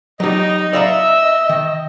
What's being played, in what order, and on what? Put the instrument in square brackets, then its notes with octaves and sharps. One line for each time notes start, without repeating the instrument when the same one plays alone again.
[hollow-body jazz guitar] F#3 G4 [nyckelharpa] D#4 [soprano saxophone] D#5
[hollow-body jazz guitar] D5 F5 A#5 [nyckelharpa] E5
[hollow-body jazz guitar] D#3